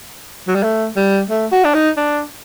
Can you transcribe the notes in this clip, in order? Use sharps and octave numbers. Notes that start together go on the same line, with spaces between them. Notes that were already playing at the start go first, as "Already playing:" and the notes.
F#3
G3
A3
G3
A3
F#4
D4
D#4
D4